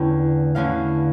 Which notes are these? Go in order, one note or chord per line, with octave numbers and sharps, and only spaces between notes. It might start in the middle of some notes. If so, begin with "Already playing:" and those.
Already playing: E2 D3 A3 C#4 G5
E2 D3 A3 C#4 F5